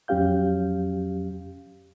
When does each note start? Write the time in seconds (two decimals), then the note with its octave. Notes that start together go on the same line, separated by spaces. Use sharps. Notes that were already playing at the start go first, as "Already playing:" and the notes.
0.08 F2 F#3 C#4 G4 F5 G6